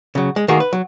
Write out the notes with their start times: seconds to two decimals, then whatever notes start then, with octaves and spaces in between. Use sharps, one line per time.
0.15 C#3 F#3
0.36 G#3
0.48 D#3 A3 A#3 F#4 G#4
0.60 B4
0.73 F#3